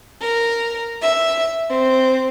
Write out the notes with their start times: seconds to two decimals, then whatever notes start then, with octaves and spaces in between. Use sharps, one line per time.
0.21 A#4
1.00 E5
1.70 C4